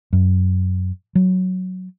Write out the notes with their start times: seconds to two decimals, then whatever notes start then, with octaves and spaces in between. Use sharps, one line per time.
0.13 F#2
1.15 F#3